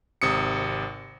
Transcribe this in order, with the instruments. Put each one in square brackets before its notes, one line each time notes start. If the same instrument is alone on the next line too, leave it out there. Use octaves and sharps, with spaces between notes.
[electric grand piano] G#1 C3 D#6 C#7